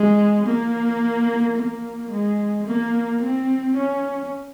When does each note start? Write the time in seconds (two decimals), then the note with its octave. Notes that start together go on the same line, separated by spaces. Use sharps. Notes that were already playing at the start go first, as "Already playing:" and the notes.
Already playing: G#3
0.46 A#3
1.56 A#3
2.11 G#3
2.66 A#3
3.22 C4
3.77 C#4